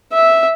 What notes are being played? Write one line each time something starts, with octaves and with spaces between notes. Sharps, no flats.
E5